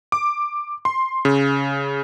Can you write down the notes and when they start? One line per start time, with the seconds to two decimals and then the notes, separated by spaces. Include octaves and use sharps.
0.12 D6
0.85 C6
1.25 C#3